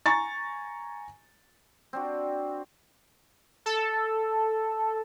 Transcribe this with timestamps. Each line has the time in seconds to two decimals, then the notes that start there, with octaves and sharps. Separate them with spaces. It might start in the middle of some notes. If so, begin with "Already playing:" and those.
0.06 G#5 A#5 C#6 A6
1.93 C4 D4 F#4
3.66 A4